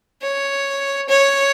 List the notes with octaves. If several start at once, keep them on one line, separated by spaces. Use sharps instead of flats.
C#5
C#5